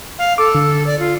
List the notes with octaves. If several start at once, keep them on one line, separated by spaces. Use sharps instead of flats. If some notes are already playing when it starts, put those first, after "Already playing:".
F5
A4 D6
D3
D5
F4